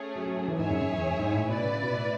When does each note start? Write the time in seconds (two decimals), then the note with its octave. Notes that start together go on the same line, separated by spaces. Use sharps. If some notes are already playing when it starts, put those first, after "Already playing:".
Already playing: A3 C#4 G#4
0.15 F#3
0.26 F#3
0.37 F#3
0.48 E3
0.59 G#2 G#4 C#5 E5 G#5
0.70 F#2
0.81 F#2
0.92 E2
1.10 F#2
1.19 G#2
1.34 A2
1.48 B2 E4 B4 D5
1.60 C#3
1.71 C#3
1.82 B2
1.93 A2